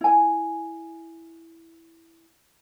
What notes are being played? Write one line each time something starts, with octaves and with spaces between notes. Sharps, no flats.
E4 G#5